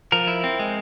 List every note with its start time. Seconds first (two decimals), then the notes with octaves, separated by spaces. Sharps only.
0.12 F3 A#4
0.27 E4
0.44 C4
0.59 G#3